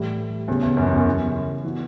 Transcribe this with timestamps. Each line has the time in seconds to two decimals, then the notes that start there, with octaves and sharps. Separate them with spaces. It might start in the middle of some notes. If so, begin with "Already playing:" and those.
Already playing: A2 E3 G3
0.48 E2 C#3 G3 C#4
0.62 E2
0.77 F#2
0.87 E2
0.96 F#2
1.05 C#3 E3 G3
1.64 E3 B3 F#4